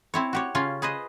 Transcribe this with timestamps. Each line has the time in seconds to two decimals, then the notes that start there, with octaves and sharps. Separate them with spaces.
0.14 C4 E4 C#5
0.33 F#4 G4 C#5
0.55 C#3 C#4 F4
0.82 G#4 B4 C5 D#5